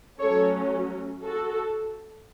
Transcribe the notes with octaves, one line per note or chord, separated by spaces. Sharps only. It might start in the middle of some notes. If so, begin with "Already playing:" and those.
F#3 A3 C#4 A4 C#5
F#4 A4